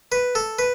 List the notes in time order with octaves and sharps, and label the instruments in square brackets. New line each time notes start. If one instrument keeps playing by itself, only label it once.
[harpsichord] B4
A4
B4